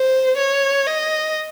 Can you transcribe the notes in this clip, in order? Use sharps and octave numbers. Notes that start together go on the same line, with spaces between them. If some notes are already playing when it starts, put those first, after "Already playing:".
Already playing: C5
C#5
D#5